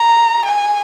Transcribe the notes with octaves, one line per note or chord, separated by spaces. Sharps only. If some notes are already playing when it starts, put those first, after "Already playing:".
Already playing: A#5
G#5